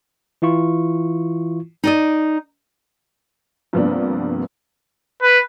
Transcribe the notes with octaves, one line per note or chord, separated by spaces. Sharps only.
E3 E4 F4 C#6
D#4 D5 D#5
G2 C3 F3 A#3 B3 D4
B4